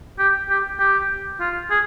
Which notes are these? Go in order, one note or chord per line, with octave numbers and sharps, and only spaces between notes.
G4
G4
G4
F4
G#4